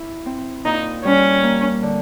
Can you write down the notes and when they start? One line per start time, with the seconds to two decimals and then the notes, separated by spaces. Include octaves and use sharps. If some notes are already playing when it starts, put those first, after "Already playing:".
Already playing: E4
0.26 C4
0.65 A#2 D#4
1.04 G3 C#4
1.43 A#3
1.83 D3